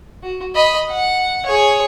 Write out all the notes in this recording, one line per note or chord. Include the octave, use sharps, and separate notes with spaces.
F#4
D#5 B5
F#5
G#4 C#5